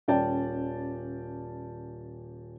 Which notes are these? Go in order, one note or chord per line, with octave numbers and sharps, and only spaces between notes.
D#1 C#4 D5 G5 A5